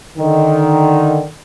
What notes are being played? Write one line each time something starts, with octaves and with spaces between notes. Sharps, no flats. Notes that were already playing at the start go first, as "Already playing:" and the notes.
D3 D#3